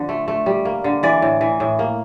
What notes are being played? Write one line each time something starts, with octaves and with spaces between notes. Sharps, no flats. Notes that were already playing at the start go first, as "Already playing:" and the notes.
Already playing: D3 F3
A3
A3
G3
A#3
D3
E3 D5
A2
E3
A2
A#3